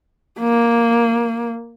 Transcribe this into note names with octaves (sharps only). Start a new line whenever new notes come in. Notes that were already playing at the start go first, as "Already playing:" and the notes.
A#3